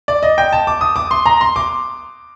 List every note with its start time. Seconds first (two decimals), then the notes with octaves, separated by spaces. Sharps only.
0.08 D5
0.23 D#5
0.38 G5
0.53 A5
0.67 D6
0.81 D#6
0.96 D6
1.11 C6
1.26 A#5
1.41 C6
1.56 D6